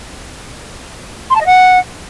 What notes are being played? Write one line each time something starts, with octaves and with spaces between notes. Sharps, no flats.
C6
A5
D#5
F#5